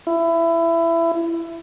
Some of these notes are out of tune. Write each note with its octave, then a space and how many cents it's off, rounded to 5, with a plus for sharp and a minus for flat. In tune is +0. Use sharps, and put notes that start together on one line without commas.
E4 +20